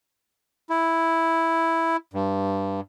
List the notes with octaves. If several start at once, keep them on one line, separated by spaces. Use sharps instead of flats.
E4
G2